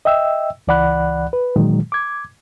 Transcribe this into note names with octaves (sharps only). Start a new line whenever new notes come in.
D#5 E5 G5 E6
C#2 E3 D5 F#5 B5 F#6
B4
A#2 D#3 E3 F#3 G#3
D6 G#6